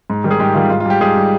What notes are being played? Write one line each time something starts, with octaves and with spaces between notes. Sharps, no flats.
G#2
D#3 G3
G#4
G#2 G4
D#3 G3 F4
G#2 F4
F4
G3 G4
G#2 G#4
G3